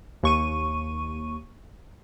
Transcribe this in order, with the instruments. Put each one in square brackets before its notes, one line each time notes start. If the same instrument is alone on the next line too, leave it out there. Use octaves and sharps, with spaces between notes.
[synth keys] D#2 C#6 D#7